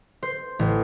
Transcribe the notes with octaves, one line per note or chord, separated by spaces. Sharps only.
C5
A1